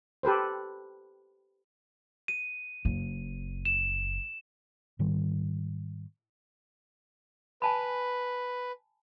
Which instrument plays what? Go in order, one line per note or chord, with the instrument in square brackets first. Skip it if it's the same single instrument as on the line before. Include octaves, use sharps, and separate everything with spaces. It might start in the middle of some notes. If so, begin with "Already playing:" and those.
[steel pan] G4 A4 B4 C5
[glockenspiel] D#7
[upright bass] F#1
[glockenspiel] E7
[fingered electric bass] G#2 D#3 G3
[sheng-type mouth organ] B4 [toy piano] G#5 A5 B5